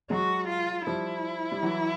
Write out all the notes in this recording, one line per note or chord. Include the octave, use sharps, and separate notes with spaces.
F#3 G#3 F#4
F4
F3 G3 E4
G3
E3 F#3